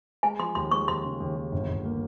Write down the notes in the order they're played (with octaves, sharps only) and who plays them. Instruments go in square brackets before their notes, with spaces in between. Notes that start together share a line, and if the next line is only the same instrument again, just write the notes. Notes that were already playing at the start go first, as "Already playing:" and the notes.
[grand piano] G#3 [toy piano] G#5
[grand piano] F3 [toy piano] C6
[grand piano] D#2 [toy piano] C6
[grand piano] G#3 [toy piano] C#6
[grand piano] D#2 [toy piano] C6
[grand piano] C#3
D#2
D#2
G1
G1
A#3